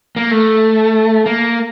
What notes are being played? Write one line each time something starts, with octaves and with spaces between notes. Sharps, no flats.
A#3
A3
A#3